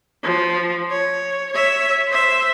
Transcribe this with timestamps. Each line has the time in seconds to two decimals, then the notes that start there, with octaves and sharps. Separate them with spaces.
0.23 F3
0.91 C#5
1.53 C#5 E5
2.08 C5 E5